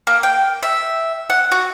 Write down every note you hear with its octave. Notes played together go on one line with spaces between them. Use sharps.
A#3
G5
E5
F#5
F#4